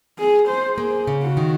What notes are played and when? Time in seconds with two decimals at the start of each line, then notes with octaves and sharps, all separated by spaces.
0.19 G#4
0.49 C5
0.78 A#3 G#4
1.07 C#3
1.23 F#4
1.37 D#3